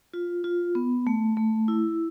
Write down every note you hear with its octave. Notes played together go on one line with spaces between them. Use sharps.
F4
F4
B3
A3
A3
E4